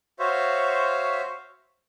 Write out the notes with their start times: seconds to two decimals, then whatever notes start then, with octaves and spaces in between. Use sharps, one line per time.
0.19 F#4 C5 C#5 E5 F5